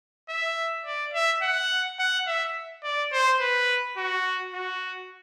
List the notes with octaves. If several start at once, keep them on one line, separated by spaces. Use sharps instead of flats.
E5
D5
E5
F#5
F#5
E5
D5
C5
B4
F#4
F#4